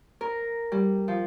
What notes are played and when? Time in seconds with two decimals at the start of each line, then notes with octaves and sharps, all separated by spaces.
0.21 A#4
0.72 G3
1.08 F3